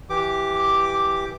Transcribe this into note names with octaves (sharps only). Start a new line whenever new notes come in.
E3 G4 D6